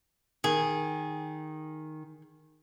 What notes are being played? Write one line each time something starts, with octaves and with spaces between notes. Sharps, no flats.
D#3 G#4